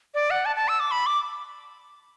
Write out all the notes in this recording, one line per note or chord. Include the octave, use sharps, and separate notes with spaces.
D5
F#5
A5
A5
E6
D6
B5
D6